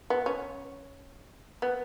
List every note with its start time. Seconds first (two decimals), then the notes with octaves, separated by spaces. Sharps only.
0.10 B3
0.26 C#4
1.62 B3